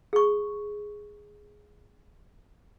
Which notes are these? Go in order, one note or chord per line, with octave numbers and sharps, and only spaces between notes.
G#4 C#6